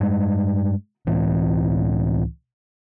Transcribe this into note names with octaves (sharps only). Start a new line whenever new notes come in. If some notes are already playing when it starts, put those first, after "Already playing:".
G2 G#3
C#2 A2 E3 C4